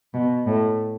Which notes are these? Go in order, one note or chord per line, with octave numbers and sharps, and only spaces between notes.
B2
A2